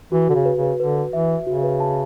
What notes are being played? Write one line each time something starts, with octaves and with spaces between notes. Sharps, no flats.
E3 F#4
D3 F#4
C#3
B4
C#3
B4
D3 B4
B4
E3 E5
E5
C#3 F#4
B4
A5